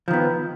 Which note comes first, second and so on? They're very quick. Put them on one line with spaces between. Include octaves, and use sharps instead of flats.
F3 D#3 B3